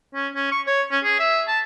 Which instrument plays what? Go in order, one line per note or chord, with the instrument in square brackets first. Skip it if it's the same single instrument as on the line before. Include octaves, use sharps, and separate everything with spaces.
[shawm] C#4
C#4
C#6
C#5
C#4
G#4
E5
A5